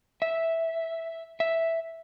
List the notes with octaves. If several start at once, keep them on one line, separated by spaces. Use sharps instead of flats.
E5
E5